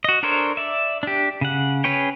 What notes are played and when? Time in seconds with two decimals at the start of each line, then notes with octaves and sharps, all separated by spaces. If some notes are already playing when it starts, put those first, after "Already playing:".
0.04 F#4 D#5
0.23 D4 A4 A#4 C5 C#5
0.57 D5 E5
1.03 D4 G4
1.41 C#3 F#5
1.84 C#4 G#4 B4 C#5 G5